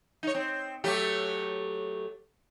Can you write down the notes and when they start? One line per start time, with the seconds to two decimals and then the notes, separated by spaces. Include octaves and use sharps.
0.23 D#4 C#5
0.35 C4
0.84 F#3 A3 G4